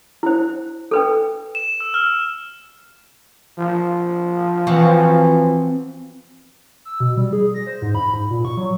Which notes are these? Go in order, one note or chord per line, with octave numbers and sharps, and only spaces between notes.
E4 C5
A4 B4 G5
E7
E6
F6
F3
E3 C4 F#4 F5
E6
B2
G3
G#4
A#6
C5
G#2
B5
G#2
A#2
C#6
F#3